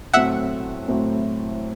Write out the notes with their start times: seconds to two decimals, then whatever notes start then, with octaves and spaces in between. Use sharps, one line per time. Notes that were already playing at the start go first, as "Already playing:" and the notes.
0.14 A2 F#3 A3 C4 E5 F#5
0.88 A2 F#3 A3 C4